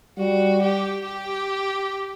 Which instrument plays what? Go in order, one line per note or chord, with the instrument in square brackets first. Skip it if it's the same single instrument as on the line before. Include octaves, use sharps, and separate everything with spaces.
[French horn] G3 [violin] F#4
[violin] G4
G4